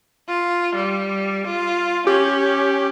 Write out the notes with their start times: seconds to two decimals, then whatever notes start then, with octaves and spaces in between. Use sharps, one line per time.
0.28 F4
0.75 G3
1.46 F4
2.07 C#4 G4